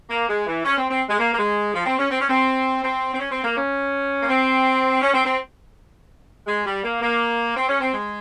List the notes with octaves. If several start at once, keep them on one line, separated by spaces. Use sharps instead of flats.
A#3
G#3
E3
C#4
C4
C4
G#3
A#3
A#3
G#3
F3
C4
C#4
C4
C#4
C4
C4
C4
C#4
C4
A#3
C#4
A#3
C4
C#4
C4
C4
G#3
G3
A#3
A#3
C4
C#4
C4
G#3